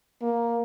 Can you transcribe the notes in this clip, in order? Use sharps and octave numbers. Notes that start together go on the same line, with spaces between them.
A#3